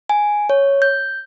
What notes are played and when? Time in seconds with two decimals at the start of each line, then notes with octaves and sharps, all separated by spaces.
0.10 G#5
0.50 C#5
0.82 G6